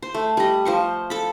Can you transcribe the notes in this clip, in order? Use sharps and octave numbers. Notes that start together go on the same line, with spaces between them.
C5
A3
G3 D#5
F3 C5 C#6
A4 B5